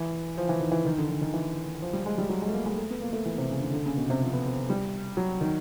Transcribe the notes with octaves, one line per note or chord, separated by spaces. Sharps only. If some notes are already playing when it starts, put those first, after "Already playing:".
Already playing: E3
F3
E3
D#3
E3
D#3
D3
D#3
D#3
E3
F3
G3
G#3
G3
F#3
G#3
A3
A#3
G#3
A3
B3
A#3
A3
E3
C3
C#3
D3
D3
C#3
B2
C3
F3
B3
C4
G3
F#3
D#3